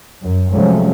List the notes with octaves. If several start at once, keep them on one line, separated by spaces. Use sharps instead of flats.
F#2
C3 F3 F#3 G#3 A3 C#4